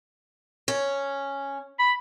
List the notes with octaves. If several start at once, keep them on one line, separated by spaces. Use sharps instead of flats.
C#4
B5